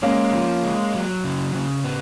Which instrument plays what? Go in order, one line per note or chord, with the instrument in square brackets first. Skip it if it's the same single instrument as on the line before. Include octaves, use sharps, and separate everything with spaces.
[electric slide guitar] G#3 [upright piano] A#3 C#4
[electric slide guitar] F3
G#3
F#3
C#3
C#3
B3